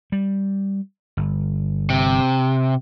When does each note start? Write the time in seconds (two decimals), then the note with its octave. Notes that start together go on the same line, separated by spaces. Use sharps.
0.12 G3
1.17 G1
1.90 C3